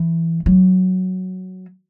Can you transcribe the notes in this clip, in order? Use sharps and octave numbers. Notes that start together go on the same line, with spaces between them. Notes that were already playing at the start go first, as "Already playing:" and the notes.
Already playing: E3
F#3